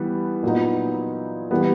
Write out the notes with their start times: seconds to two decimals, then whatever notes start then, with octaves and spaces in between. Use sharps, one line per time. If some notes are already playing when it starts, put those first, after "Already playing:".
Already playing: E3 G3 B3
0.43 A#2 F#3 B3 D#4
1.51 E3 G3 B3